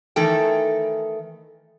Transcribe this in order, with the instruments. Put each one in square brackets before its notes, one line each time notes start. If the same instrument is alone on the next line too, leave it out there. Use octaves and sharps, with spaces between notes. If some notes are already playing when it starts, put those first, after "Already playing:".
[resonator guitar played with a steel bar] D#3 E3 A3 A4 G5